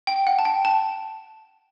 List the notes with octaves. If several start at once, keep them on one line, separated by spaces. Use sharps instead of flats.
G5
F#5
A5
G5
A5